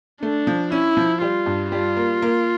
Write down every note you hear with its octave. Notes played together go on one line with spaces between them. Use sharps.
A3 D4
F3
C#4 E4
F3
G3 F4
G2
G3 F4
A#3
A#3